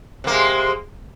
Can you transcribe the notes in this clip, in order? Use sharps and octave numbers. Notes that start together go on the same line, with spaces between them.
C3 G#3 A#3